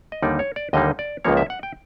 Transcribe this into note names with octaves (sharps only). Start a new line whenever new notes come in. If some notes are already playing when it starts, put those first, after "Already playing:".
D#5
D#2 D3 G3 A#3 D#4 D5
C#5
D5
D#2 D3 G3 A#3 D#4 D#5
D5
C#2 C#3 F3 A#3 C#5
E5
F#5
G5